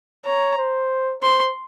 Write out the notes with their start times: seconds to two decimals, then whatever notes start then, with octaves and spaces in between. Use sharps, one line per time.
0.25 C#5 A#5
0.58 C5
1.22 C5 C6